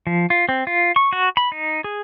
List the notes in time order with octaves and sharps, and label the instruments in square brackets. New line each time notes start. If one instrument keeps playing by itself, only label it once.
[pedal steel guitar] F3
F4
C4
F4
C#6
F#4
B5
D#4
G#4